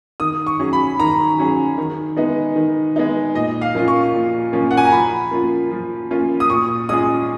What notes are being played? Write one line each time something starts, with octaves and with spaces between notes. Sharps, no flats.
D#3 D#6
C#6
F#3 C#4 G#4
B5
D#3 A#5
F#3 C#4 G#4
D#3
G#3 B3 D#4
D#3
G#3 B3 D#4
A#2 D#5
F5
F3 A#3 C#4 F4
C#6
A#2
F3 A#3 C#4 F4
F#5
G#5
A#5
F3 B5
A#3 C#4 F4
F3
A#3 C#4 F4
D#6
A#2 C#6
G#3 C#4 F4 G#4 D#6